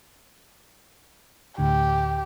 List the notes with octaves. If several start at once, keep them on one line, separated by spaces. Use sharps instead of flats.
D2 A2 D3 G4